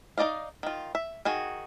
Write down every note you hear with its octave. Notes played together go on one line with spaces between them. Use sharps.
D#4 A#4 D5 D#5 F5
D#3 F4
E5
D#3 F#4 G#4